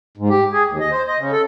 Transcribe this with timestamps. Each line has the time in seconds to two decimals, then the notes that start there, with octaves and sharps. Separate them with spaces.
0.17 G#2
0.29 G4
0.53 G#4
0.68 D#2
0.80 D#5
0.91 C5
1.07 D#5
1.18 C#3
1.31 A4